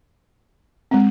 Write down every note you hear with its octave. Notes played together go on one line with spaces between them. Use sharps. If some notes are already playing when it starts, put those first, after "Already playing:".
G#3 C4